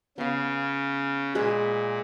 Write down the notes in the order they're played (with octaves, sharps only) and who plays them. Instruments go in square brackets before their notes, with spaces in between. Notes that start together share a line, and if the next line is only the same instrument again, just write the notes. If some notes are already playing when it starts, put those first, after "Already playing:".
[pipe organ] C#3 [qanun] B3 F5
[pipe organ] A#2 [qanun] G#3 G#4 B4